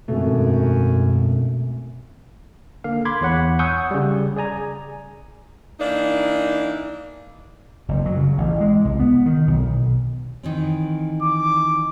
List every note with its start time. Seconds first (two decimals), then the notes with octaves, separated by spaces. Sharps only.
0.08 G#1 F#2 B2 A3
2.84 D3 A#3 F5
3.05 B5 C6 D6 G#6
3.21 E2 C#5 F#5 B5
3.59 F#5 G#5 C#6 D#6 E6 G6
3.91 C#3 G3
4.36 G#4 D5 G#5 A#5
5.79 E3 A#3 D4 D#4 D5
7.89 F#1
8.06 F#3
8.17 C#3
8.38 A1
8.60 G#3
8.85 C2
9.00 B3
9.26 D#3
9.47 B1
10.43 D#3 E3 C4
11.22 D6